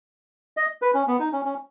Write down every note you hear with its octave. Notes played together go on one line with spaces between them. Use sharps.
D#5
B4
C#4
B3
D#4
C#4
C#4